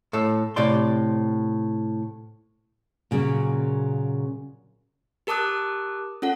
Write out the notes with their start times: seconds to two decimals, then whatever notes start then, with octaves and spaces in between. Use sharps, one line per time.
0.13 A2 A4
0.56 A2 C3 D5 C6
3.11 A#2 C#3 F#3 A#3
5.27 G4 A#4 A5 D6 D#6 F#6
6.22 C#4 F4 A4 F#5